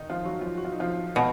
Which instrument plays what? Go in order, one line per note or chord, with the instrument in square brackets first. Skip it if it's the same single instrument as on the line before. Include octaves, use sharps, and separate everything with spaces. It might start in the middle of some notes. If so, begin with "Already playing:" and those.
Already playing: [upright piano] D#3 D#4
F3 F4
F#3 F#4
F3 F4
F#4
F4
D#4
F3 F4
[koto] B2